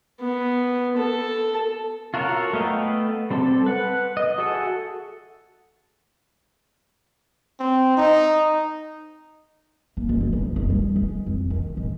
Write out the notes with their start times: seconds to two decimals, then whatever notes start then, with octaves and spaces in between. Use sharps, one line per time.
0.21 B3
0.98 A4
2.14 F4 F#4 A4 A#4 C#5
2.53 A3 B3 D#5 F5 G5
3.30 G3 C4 G4 A4
3.66 B4 F#5
4.17 D#5
4.38 F#4 G#4 A4 E5 F#5
7.60 C4
7.97 D#4
9.97 A#3
10.09 F#1
10.21 F#2
10.33 E2
10.56 F#1
10.70 G3
10.96 G#3
11.26 F2
11.50 D#3
11.77 G#2